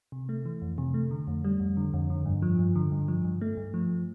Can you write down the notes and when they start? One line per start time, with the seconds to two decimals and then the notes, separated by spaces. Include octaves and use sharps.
0.12 C3
0.29 A3
0.45 E3
0.62 F2
0.78 C3
0.94 A3
1.11 D3
1.27 F2
1.44 G3
1.60 F2
1.77 D3
1.94 F2
2.10 D3
2.26 G2
2.42 F3
2.59 G2
2.76 D3
2.92 G2
3.08 F3
3.25 G2
3.41 A3
3.57 G2
3.74 F3